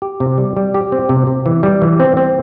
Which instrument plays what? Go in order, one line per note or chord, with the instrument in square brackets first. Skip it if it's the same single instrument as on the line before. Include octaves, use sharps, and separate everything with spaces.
[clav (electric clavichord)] G4
C3
G3
G3
G4
C4
C3
C3
E3
G3
E3
C4
C4